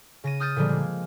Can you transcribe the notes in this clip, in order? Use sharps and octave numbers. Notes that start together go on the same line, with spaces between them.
C#3 A#6 D#7
D#6 F6 G6 A6 D#7
A#2 D3 F3 G3 G#3 A#3
G#3